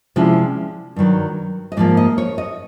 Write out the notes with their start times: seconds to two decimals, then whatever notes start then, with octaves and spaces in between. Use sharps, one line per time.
0.16 C3 F3 G#3 C#4 E4 D5
0.96 G2 D#3 F#3
1.72 D#5
1.77 G#2 F3 A#3 D5
1.97 D#5
2.18 C#5
2.38 D#5